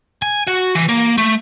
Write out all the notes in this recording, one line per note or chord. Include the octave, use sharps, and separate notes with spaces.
G#5
F#4
E3
A#3
A3